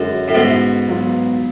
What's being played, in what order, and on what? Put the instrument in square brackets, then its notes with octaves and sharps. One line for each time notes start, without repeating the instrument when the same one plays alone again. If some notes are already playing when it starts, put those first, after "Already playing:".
Already playing: [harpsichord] F#2 [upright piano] D3 G#3 C#4
[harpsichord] A2
G#2 B2
[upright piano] F#3 B3 F4